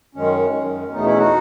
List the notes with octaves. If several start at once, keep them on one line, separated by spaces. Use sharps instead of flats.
F#2 D#3 G#3 C#4
F#2 D#3 G#3
E2 B2 A3 B3 D#4
C#4 E4
D#4 F#4